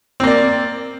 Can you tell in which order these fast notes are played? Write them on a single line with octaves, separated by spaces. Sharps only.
C4 A#3 D5